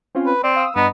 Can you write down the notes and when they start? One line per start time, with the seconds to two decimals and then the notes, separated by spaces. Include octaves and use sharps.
0.15 C4 C#4 F4
0.26 B4
0.44 C4 D5
0.56 F5 D#6 E6
0.76 G2 B3 D#5 A#5